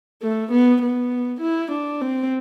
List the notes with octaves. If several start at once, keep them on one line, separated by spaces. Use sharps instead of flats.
A3
B3
B3
E4
D4
C4